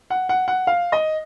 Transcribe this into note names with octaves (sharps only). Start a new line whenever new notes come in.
F#5
F#5
F#5
F5
D#5